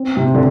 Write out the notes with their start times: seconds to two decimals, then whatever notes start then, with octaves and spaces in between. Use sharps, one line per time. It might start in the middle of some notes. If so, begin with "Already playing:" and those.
Already playing: C4
0.17 C3
0.34 D3